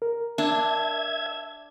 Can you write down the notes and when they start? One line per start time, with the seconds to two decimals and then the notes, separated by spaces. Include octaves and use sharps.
0.02 A#4
0.38 D4 E5 G#6